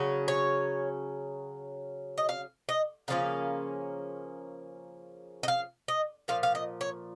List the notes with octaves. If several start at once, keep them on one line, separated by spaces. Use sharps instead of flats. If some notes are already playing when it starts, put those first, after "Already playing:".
Already playing: C#3 F#3 C#4
C#5
D#5
F5
D#5
C#3 F3 A#3 C#4 F5
D#5
F5
D#5
A#2 F3 F5
F5
D#5
C#5